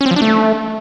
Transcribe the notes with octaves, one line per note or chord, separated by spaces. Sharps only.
C#4
C4
F3
D4
A3